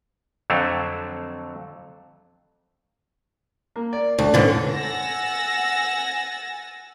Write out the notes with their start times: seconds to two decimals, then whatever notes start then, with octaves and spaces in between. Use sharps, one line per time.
0.50 F2 D3 F#3 A3
3.76 A#3
3.93 D5
4.18 D2 D4
4.34 F2 G#2 D3 C#4 B4
4.71 F#5 G#5 E6 A6 A#6